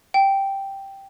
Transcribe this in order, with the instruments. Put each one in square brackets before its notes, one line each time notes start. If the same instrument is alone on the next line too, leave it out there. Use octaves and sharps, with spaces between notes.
[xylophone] G5